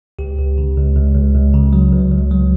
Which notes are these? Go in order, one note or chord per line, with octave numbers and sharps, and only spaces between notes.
C#2 G4
C#2
C#3
C#2
C#2
C#2
C#2
C#3
F#3
C#2
C#2
F#3